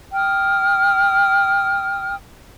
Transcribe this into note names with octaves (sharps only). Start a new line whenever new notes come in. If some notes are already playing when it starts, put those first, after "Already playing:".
G5 D#6 F6